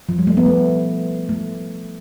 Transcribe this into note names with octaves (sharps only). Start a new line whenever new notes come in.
F3
G3
A3
B3
A3
A3